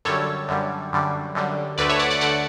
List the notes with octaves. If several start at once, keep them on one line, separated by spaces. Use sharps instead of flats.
F#2 D3 G3 A4 C#5
F#2 D3 G3
F#2 D3 G3
F#2 D3 G3
D2 D3 A3 B4 D5
C#5 E5
D5 F#5
D5 F#5
D3 A3 D5 F#5